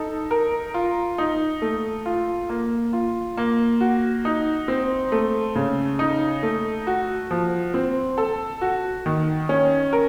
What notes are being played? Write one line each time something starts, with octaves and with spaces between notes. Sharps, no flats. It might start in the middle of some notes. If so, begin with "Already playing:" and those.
Already playing: D#4 A4
A#4
F4
D#4
A3
F4
A#3
F4
A#3
F#4
D#4
C4
A3
C#3
D#4
A3
F#4
F3
C4
A4
F#4
D#3
C#4
A#4